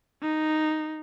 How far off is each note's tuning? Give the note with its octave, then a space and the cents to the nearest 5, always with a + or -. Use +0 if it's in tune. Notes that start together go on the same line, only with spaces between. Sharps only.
D#4 -5